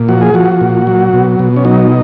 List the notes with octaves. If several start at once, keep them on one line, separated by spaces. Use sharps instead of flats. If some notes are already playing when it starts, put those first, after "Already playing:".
Already playing: A#2
F3 F#4
G#4
F3 F#4
A#2
F#3
B2
B2
C#4
F#3 D#4